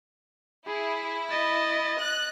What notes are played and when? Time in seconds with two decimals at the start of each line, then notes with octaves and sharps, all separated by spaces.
0.67 E4 G#4
1.31 D#5 A6
2.01 F#6